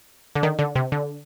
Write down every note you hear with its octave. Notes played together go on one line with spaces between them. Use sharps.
D3
D#3
D3
C3
D3